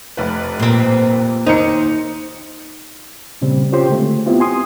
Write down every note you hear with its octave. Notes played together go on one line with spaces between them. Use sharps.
F1 B4
A#2 C4
D#2 D#4 C5 C#7
A#2 C#3 G3 C4
C4 C#4 F4 G4 C5
D3 G#3 A3
B3 C4 E4 F4 G4
G#5 C6 D#6